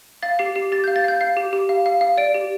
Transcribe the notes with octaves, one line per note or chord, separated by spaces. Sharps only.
F5 A6
G4 C7
G4 C7
G4 A6
G6
F5
A6
F5 G6
F5 C7
G4
G4
F5
F5
F5
D5 D7
G4